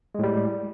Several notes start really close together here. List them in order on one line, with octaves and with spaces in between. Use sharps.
G#3 A2 G3